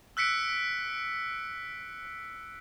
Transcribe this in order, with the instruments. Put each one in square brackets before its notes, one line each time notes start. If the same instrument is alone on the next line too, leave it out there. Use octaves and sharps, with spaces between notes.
[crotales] E6 F#6 B6 C#7 D7